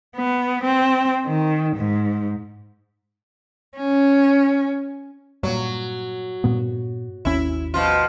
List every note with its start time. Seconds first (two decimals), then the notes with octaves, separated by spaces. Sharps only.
0.17 B3
0.64 C4
1.26 D#3
1.76 G#2
3.77 C#4
5.43 G2 A#2 F#3
6.44 G2 A#2 B3
7.25 G#1 D#2 C#4 E4
7.74 B2 F3 F4